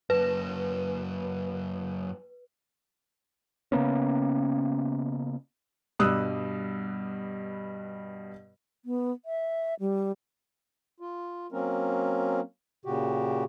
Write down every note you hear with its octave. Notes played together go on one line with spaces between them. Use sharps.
F#2 A#3 B4
C#3 A#3 B3 C#4
G2 B2 G3 D#6 E6 F#6
B3
E5
G3
F4
F#3 A#3 C4 C#4 A#4
A#2 C#3 F#4 G4